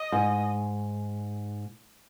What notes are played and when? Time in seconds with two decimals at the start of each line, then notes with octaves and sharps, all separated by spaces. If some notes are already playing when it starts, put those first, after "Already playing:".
Already playing: D#5
0.12 G#2